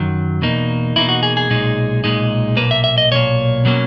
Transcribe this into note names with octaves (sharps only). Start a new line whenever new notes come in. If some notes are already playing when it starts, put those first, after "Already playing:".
Already playing: F#2 D#3 F#3
E2 B2 A#3 D#4
E2 B2 A#3 D#4 E4
F#4
G#4
G#4
B1 A#2 G#3 D#4
B1 A#2 G#3 D#4
B1 A#2 A#3 B4
E5
E5
D#5
B1 A#2 A#3 C#5
B2 F#3 A#3 C#4